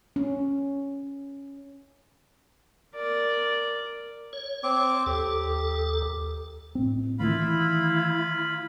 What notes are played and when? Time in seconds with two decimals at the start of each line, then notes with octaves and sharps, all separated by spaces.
0.16 C#4
2.95 A#4 D5
4.33 C#5
4.63 C4 D6
5.06 D#2 G4 A4
6.75 A2 C4
7.19 D#3 E3 A3 E4 F4 F5 B5